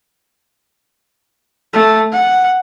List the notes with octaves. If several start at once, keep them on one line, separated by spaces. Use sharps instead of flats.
A3
F#5